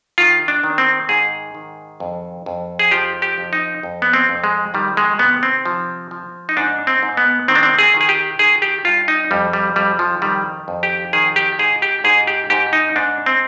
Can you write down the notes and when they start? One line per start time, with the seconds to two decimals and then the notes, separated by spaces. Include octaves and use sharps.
0.18 D#3 F4
0.48 D4
0.64 D#3
0.78 C4
1.09 G#2 G#4
1.55 D#3
2.00 F2
2.46 F2
2.79 G#4
2.91 F3 G4
3.22 G4
3.38 F2
3.53 D#4
3.83 F2
4.02 B3
4.13 C4
4.29 F2
4.44 G#3
4.74 D#3 G3
4.97 G#3
5.19 C3 B3
5.43 C4
5.65 F3
6.11 F3
6.49 D#4
6.57 G#2 D4
6.87 C4
7.03 G#2
7.17 B3
7.48 D#3 C4
7.55 D4
7.63 C4
7.79 G#4
7.94 D#3
8.01 G#4
8.09 G4
8.39 D#3 G#4
8.62 G4
8.85 G2 F4
9.08 D#4
9.31 F2 G3
9.53 G3
9.76 F2 G3
9.99 F3
10.22 D#3 G3
10.68 F2
10.83 G4
11.13 D#3 G#4
11.36 G4
11.59 G#2 G#4
11.82 G4
12.04 G#2 G#4
12.27 G4
12.50 G#2 G4
12.73 D#4
12.96 G#2 D4
13.26 C4